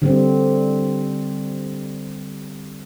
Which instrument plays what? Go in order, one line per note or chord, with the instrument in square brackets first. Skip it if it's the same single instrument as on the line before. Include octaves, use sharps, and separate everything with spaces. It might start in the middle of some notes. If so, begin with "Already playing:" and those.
[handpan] D3 G3 C4